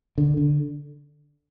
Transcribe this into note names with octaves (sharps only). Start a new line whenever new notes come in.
D3
D3